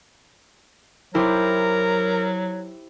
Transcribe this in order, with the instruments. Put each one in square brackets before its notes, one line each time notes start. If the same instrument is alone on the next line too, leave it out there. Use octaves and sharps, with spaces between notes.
[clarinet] F#3 [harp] E4 G4 C5 [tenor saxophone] A#4